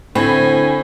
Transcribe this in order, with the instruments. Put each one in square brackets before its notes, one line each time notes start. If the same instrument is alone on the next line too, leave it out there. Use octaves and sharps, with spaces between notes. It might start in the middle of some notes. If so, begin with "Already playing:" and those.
[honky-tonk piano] A2 [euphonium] D3 [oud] C4 [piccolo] G#5